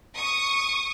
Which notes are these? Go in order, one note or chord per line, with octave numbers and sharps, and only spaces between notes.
C#6 D#6